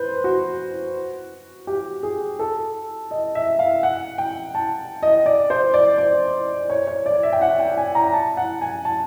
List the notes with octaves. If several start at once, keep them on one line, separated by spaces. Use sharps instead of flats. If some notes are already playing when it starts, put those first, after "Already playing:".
Already playing: B4 C5
F#4
G4
G#4
A4
D#5
E5
F5
F#5
G5
A5
D#5
D5
C5
D5
D5
C#5
C#5
D5
E5
G5
F#5
G5
G#5
A#5
A5
F#5
G#5
A5